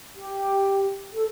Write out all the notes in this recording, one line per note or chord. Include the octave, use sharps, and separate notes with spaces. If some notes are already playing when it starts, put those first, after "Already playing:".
G4
A4